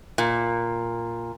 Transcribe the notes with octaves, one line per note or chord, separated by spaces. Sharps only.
A#2